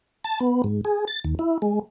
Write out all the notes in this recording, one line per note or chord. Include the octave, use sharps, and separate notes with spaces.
A5
B3
G#2
G#4
A6
D#2
E4
G#3